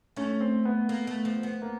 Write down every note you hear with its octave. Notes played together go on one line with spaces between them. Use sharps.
A3 C#4
C4
B3
A#3
A3
F3
B3
A#3